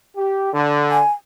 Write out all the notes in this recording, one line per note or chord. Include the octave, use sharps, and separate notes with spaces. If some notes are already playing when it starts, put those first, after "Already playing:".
G4
D3
G#5